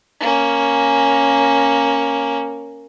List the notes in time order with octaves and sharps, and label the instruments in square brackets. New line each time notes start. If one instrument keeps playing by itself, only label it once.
[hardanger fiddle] A#3 C#4